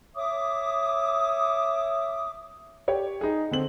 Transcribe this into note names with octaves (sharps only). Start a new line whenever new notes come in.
C#5 E5 D6 D#6
G4 C#5 D5
D#4 G#4
D3 C4 F#7